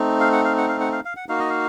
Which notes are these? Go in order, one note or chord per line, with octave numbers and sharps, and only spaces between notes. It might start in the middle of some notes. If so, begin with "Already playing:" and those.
Already playing: A3 C4 D#4
F5
F#5
F5
F#5
F5
F#5
F5
F5
F#5
A#3 D#4 F#4 F5
D#5
F5